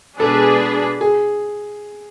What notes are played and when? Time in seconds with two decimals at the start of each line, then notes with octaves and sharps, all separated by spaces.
0.20 B2 G#3 D4 G#4 A4 B4
1.01 G#4